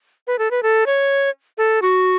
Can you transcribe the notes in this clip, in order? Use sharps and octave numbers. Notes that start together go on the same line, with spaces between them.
B4
A4
B4
A4
C#5
A4
F#4